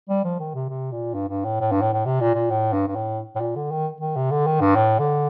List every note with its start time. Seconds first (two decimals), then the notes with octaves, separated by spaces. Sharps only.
0.09 G3
0.24 F3
0.39 D#3
0.54 C3
0.69 C3
0.92 A#2
1.14 G2
1.29 G2
1.45 A2
1.60 A2
1.71 G2
1.82 A2
1.93 A2
2.05 C3
2.20 A#2
2.34 A#2
2.50 A2
2.73 G2
2.88 G2
2.95 A2
3.35 A2
3.40 A#2
3.56 D3
3.71 D#3
4.01 D#3
4.16 C3
4.31 D3
4.46 D#3
4.61 G2
4.76 A2
4.99 D3